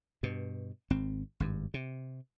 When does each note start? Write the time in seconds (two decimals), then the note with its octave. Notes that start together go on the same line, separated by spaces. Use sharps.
0.23 G2 B2
0.90 G#1 C4
1.40 G#1 G2
1.74 C3